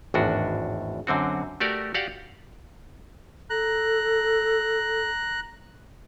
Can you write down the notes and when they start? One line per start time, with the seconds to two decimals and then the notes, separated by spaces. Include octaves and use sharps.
0.14 G#1 E2 A2 D4 F#4
1.07 F#2 D3 C4 F#4
1.60 A3 F#4 G4 A#4 D5
1.94 F#4 G4 D5 F5 F#5
3.50 A4 A#5 F#6